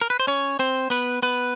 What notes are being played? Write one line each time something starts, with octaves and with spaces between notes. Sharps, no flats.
A#4
B4
C5
C#4 C#5
C4 C5
B3 B4
B3 B4